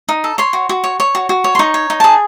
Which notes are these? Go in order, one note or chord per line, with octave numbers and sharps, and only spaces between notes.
D#4
A4
C#5 C6
F#4
F#4
C#5
C#5
F#4
F#4
C#5
C6
D#4 C#6
C#5
D#4
G#4 A5